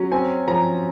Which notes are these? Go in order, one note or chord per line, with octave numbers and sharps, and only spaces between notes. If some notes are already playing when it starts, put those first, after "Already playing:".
Already playing: F#3 C#4
C4 G#5
F3 A#5